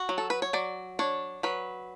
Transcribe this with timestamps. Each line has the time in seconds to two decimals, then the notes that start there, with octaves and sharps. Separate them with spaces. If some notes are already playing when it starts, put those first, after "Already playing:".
Already playing: F#4
0.09 F#3
0.18 A4
0.30 B4
0.42 C#5
0.53 F#3 D5
0.99 D4 C#5
1.43 F#3 B4